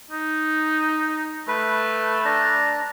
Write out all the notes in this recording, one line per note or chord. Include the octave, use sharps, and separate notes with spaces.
D#4
A3 B4
D4 A5 A#5